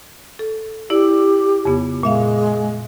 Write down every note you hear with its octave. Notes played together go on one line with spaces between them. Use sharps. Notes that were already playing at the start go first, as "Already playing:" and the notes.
A4
E4 G4 D5
F2 C#3 B3
A#2 G#3 E5 F5